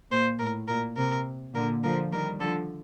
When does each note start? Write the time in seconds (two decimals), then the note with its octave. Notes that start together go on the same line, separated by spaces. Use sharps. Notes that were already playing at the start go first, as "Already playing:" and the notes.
0.11 A#2 C5
0.39 A2 A#4
0.68 A#2 A#4
0.97 C3 A#4
1.55 A#2 D3 A#4
1.84 D3 F3 A#4
2.12 D#3 G3 A#4
2.40 D3 F3 A4